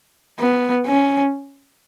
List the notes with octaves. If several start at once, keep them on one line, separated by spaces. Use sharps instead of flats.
B3
C#4